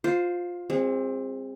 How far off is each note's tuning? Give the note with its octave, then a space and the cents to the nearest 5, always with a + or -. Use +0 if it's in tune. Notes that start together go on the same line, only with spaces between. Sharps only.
F4 +15 C5 -5
G#3 -30 C4 +15